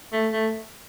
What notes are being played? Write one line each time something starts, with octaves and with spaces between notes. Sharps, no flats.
A3
A3